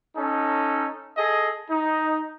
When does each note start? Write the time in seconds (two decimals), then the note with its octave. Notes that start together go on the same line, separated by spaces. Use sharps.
0.15 C#4 D#4 A4
1.17 G#4 A4 D#5
1.69 D#4